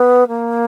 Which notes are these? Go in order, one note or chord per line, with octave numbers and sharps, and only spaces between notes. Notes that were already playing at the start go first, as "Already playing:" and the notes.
Already playing: B3
A#3